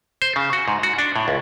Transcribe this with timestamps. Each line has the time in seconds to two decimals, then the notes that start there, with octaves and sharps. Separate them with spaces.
0.22 C5
0.36 C#3
0.53 F#4
0.68 G#2
0.83 F#4
0.98 D4
1.16 A2
1.28 C#2